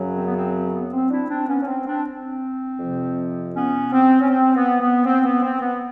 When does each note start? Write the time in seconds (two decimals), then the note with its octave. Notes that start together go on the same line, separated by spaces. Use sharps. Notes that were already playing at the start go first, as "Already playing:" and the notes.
Already playing: F#2 C#3 F#3
0.17 C4
0.27 B3
0.36 C4
0.55 C4
0.73 B3
0.93 C4
1.10 D4 E4
1.29 C4 D4
1.48 B3 C#4
1.62 C#4
1.68 C4
1.86 C4 D4
2.05 C4
2.80 F2 C3 F3
3.55 B3 C#4
3.93 C4
4.21 C#4
4.30 C4
4.56 B3
4.81 B3
5.06 C4
5.25 B3
5.42 C4
5.61 B3